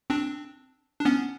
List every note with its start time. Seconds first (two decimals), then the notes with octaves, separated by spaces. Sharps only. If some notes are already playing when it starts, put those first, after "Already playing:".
0.10 C4 D4
0.99 D4
1.05 B3 C#4